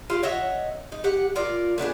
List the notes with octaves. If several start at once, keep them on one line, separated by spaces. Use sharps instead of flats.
F4 G4 D5
C#5 D#5 E5 F#5
D#4
G4 F#5
F4 A#4 D5
A3 B3 D4 G#4